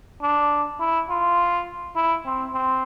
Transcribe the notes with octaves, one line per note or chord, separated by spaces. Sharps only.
D4
E4
F4
E4
C4
C4